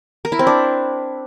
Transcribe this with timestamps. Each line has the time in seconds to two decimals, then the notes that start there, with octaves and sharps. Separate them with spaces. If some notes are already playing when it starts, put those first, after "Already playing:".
0.25 A#4
0.32 E4
0.39 C4
0.47 D4